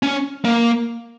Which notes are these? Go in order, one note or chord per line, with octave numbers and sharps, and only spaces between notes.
C#4
A#3